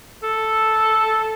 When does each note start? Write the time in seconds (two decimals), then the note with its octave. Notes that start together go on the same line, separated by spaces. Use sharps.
0.23 A4